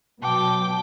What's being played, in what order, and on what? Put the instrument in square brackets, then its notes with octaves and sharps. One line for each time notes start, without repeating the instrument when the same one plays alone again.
[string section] B2 F#3 [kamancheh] G5 D6 [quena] A5